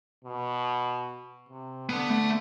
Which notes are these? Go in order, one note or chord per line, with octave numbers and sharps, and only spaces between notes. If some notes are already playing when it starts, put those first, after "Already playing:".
B2
C3
D3 B3
A3